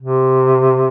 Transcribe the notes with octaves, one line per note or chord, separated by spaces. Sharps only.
C3